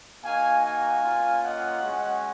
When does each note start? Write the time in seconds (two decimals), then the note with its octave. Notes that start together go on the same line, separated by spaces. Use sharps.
0.23 A#3 D#4 F#4 F5 G#5
0.63 F5 G#5
1.03 A#3 C#4 F4
1.43 D#5 F#5
1.83 G#3 C#4 F#4